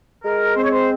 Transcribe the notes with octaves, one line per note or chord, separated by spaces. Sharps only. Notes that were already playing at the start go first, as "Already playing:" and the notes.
G#3 A#4
C4 C5
C#5
C5